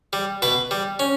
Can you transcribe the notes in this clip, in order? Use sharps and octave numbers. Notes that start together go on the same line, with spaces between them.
G3
B2 B4
G3
C#4